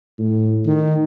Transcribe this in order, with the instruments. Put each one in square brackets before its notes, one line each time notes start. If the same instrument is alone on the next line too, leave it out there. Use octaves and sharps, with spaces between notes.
[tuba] A2
D#3